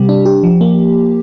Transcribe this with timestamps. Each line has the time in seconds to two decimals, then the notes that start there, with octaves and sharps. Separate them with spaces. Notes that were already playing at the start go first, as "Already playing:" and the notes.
Already playing: C3 G3 G4
0.09 D4
0.25 G4
0.43 F3
0.61 A#3